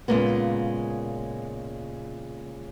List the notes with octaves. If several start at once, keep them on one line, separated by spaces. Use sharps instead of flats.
A#2 C#3 G#3 A#3 B3